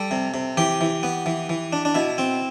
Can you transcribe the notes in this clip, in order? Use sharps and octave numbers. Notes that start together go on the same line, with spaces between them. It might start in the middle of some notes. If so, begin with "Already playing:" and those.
Already playing: G3 A4
C3
C3
E3 G4
E3
B3
E3
E3
D4
D4
B2 E4
C4